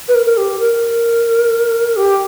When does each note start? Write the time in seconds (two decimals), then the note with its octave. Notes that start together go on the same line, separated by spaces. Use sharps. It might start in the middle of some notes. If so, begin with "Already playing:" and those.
0.08 B4
0.15 A#4
0.26 A#4
0.37 G4
0.60 A#4
1.97 G4